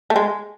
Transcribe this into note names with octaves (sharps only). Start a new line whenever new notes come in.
A3
G#3